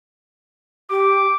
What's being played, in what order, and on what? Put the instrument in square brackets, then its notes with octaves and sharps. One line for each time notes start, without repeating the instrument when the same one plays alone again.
[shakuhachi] G4 [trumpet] D6